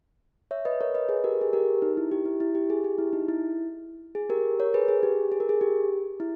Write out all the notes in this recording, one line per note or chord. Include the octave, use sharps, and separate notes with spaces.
C#5 E5
B4 D#5
A#4 C#5
B4 D#5
G#4 B4
G4 A#4
G#4
G4 A#4
D#4
E4
G4
E4
E4
G4
G#4
G4
E4
D#4
E4
G#4
G4 A#4
A#4 C#5
G#4 B4
G#4
G4
G#4
A#4
G#4
G4
E4